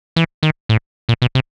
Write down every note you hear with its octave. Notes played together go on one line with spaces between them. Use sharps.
E3
D#3
A2
A#2
B2
C3